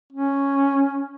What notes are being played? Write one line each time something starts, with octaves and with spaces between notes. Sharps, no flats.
C#4